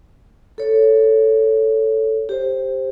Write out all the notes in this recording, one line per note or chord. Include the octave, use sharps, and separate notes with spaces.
A4 C#5
G4 C5